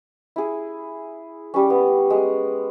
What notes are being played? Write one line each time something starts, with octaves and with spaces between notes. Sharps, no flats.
E4 G#4
G3 C#4
B3
G#3